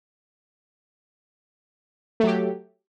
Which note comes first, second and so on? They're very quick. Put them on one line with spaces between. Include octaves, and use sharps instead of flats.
A3 F#3 G4